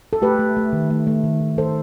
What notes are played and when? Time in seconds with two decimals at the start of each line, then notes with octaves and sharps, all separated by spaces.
0.13 A4
0.22 A3 G4 B4
0.39 A3
0.57 A3
0.73 D#3
0.90 A3
1.07 A3
1.24 D#3
1.40 D#3
1.57 D#3 A4 C5